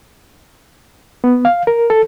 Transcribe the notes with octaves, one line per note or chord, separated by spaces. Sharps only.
B3
F5
A#4
A4